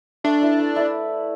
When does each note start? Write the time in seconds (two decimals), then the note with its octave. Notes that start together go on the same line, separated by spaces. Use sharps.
0.24 A3 D4
0.42 E4 B4 D5
0.59 A3
0.76 E4 B4 D5